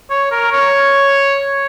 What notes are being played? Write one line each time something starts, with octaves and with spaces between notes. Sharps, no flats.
C#5
A#4
C#5